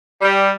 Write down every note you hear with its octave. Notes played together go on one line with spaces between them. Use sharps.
G3